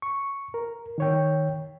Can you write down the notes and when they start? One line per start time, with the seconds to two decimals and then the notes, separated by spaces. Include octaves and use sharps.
0.02 C#6
0.54 A#4
0.98 D#3 C#5 G5